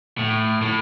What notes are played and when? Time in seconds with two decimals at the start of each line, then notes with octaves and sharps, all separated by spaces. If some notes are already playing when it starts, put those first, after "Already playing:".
0.18 A2
0.62 A2